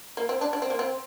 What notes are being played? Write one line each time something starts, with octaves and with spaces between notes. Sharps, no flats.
A#3
C4
D4
D4
C4
A#3
C4